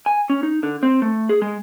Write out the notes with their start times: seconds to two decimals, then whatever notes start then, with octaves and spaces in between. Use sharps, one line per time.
0.06 G#5
0.30 C#4
0.43 D#4
0.63 D3
0.83 C4
1.02 A3
1.29 G#4
1.42 G#3